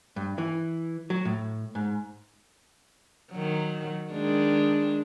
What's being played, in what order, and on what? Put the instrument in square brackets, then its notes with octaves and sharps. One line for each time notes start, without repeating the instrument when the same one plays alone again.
[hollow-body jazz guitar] G2
E3
F#3
A2
G#2
[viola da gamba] D#3 F#3
D#3 G#3 D4